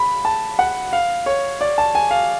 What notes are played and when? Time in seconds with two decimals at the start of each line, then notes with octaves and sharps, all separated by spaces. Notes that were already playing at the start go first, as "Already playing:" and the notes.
Already playing: B5
0.25 A5
0.59 F#5
0.93 F5
1.26 C#5
1.61 D5
1.78 A5
1.95 G#5
2.11 F5